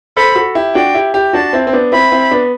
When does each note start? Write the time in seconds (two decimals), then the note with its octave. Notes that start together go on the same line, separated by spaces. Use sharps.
0.17 A4 C5 B5
0.35 F#4 A4
0.55 E4 G4
0.75 D4 F#4 G5
0.95 E4 G4
1.14 E4 G4
1.33 D4 F#4 A5
1.53 C4 E4
1.67 C4
1.73 B3 D4
1.92 C4 E4 B5
2.12 C4 E4
2.31 B3 D4